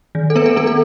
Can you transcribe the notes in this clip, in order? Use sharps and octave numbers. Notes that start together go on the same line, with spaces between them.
D#3
A4
B3 B4
A4
B3 A4
A4